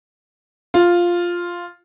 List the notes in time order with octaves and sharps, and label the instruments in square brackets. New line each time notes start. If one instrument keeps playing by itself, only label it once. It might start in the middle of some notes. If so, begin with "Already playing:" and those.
[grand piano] F4